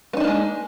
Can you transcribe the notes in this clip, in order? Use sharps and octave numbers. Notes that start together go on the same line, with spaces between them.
G#3 A#3 B3 D4 D#4